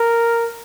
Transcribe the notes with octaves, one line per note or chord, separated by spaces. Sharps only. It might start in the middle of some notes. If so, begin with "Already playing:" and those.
Already playing: A#4